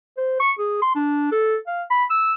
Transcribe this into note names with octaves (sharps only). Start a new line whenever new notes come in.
C5
C#6
G#4
C6
D4
A4
F5
B5
E6